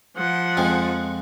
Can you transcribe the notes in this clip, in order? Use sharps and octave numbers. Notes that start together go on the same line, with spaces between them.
F3 F#5
F2 G#3